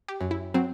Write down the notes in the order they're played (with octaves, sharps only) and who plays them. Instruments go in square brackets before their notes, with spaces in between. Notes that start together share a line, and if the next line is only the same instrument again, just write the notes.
[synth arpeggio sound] G4
[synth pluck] F#2
[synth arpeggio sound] E4
[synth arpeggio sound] F#3 [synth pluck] C4